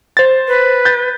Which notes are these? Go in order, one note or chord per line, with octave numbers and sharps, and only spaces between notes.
C5 A6
B4
G6 A6